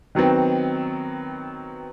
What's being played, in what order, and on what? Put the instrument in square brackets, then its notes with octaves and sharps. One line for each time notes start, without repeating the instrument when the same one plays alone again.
[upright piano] D#3 F#3 B3 C4